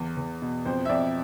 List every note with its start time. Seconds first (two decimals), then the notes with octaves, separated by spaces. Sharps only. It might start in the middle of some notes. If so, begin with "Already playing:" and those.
Already playing: E2
0.17 E2
0.42 B2
0.65 F2 C5
0.85 E5
0.89 F2 D5